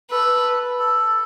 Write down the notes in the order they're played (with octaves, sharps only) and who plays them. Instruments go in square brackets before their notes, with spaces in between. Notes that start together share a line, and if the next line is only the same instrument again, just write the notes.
[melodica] A4 [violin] B4
[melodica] A4